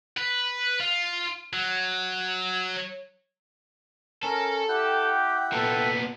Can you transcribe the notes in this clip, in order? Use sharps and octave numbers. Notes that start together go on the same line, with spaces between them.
B4
F4
F#3
C#4 A4 A#4
E4 G4 F#5 G5
A#2 B3 A4